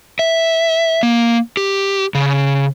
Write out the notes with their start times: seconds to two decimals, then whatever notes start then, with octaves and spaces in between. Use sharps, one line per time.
0.19 E5
1.03 A#3
1.57 G4
2.15 C#3